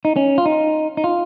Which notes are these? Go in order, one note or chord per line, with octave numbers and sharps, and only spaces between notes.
D#4
C#4
F4
D#4
D#4
F4